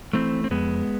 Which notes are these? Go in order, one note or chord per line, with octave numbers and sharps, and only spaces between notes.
E3 A3 C4
C4
F2 G#3 B3